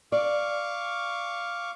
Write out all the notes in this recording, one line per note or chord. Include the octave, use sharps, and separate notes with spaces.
D5 F5 C#6 D6